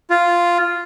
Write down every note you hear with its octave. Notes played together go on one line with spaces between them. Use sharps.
F4